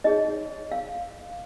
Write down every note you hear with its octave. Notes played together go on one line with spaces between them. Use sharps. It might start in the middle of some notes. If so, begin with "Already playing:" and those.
D#4 G#4 C#5 D#5
F5